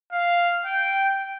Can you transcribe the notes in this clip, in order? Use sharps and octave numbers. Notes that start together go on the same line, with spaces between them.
F5
G5